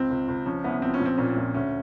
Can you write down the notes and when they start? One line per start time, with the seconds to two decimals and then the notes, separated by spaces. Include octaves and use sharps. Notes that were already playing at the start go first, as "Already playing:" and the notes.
Already playing: C#2 C4
0.10 C#2
0.28 C#2
0.46 F3 C#4
0.64 C2 B3
0.82 F3 C4
0.94 C#4
1.00 A#1
1.05 C4
1.17 A#2 C#4
1.29 C4
1.36 A#1
1.54 D2 C#4